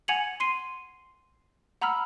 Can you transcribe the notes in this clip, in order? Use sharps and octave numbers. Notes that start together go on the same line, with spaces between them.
F#5 G#5 G#6 C#7 F7 F#7
C6 C7 D#7
F#5 A#5 B5 E6 F6